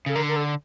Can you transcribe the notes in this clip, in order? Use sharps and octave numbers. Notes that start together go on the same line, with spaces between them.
C#3 A4
D3 A#4
A#4
A4